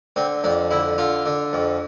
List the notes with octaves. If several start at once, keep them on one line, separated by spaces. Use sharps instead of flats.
D3 C4
F2 D4
D3 E4
D3 F4
D3
F2